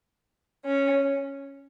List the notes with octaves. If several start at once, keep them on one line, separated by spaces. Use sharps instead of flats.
C#4